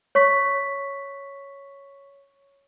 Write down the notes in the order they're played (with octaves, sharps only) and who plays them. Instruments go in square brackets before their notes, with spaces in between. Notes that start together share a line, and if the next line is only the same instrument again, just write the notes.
[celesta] C#5 C#6 B6